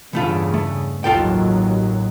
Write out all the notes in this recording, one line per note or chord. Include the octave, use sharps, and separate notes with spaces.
E2 G2 C#3 E3 A3 F4
A3
A1 D#2 F#3 F4 A4 G5